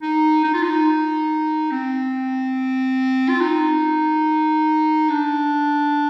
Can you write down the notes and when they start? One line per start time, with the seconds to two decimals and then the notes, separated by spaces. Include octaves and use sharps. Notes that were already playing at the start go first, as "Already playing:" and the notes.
0.02 D#4
0.44 D#4
0.54 F4
0.63 D#4
1.71 C4
3.29 F4
3.41 D#4
5.10 D4